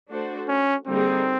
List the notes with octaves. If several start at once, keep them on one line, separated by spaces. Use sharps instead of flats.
A3 D4 F#4 A4 C5
C#4
D3 G3 A#3 C4 D#4 G#4